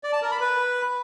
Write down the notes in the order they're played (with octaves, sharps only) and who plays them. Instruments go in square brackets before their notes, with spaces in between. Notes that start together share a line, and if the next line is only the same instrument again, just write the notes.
[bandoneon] D5
A5
A#4
B5
B4